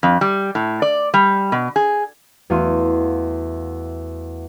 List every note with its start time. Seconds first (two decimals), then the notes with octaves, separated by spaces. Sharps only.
0.03 F2
0.21 G3
0.55 A2
0.82 D5
1.14 G3
1.52 B2
1.76 G#4
2.50 E2 A3 F#4 F5 C6 D#7